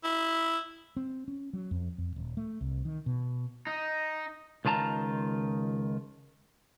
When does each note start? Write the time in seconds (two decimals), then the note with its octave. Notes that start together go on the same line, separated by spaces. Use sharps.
0.04 E4
0.97 C4
1.28 C#4
1.53 F#3
1.71 F2
1.98 F2
2.16 D#1
2.37 A3
2.61 C2
2.85 D#3
3.06 B2
3.67 D#4
4.65 C#2 D#3 F4 A5 A#5